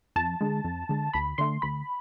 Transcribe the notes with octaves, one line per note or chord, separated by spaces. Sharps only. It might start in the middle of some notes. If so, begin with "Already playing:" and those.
F2 A5
D3 G#3
F2
D3 G#3
D2 B5
D3 A3 C6
D2 B5